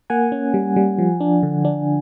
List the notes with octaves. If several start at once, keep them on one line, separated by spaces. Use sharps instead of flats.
A#3 F#5 G#5
C#4
G3
G3
F3
D4
D3
D4